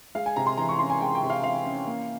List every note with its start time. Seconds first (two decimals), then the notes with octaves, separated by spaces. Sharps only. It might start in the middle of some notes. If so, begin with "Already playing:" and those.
0.15 G#3 F5
0.26 G#5
0.36 C3 A#5
0.46 C6
0.58 E3 A#5
0.69 C#6
0.79 C#4 C6
0.90 G#5
1.01 G#3 G5
1.15 G5
1.22 C3
1.30 F5
1.43 E3 F5
1.65 C#4
1.86 A#3